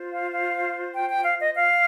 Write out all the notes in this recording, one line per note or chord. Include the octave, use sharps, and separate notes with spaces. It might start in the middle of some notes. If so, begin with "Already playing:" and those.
Already playing: F4 C5
F5
F5
G5
G5
F5
D#5
F5